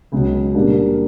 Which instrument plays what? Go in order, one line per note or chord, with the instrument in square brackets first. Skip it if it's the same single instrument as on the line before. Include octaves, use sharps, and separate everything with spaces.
[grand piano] C#2 B2 F#3
A#2 G3 A#3 D4